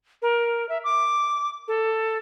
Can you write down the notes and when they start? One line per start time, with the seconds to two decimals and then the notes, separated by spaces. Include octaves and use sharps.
0.22 A#4
0.69 E5
0.84 D6
1.68 A4